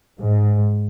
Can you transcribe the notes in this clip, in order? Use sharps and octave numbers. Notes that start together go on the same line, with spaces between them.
G#2